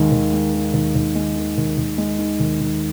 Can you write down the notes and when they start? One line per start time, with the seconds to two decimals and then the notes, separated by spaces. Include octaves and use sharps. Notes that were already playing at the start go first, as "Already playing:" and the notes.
Already playing: D#2 D#3 G#3
0.12 D#2
0.33 G#3
0.54 D#3
0.74 D#2
0.95 D#2
1.15 G#3
1.36 D#3
1.58 D#2
1.78 D#2
1.98 G#3
2.19 D#3
2.40 D#2
2.61 D#2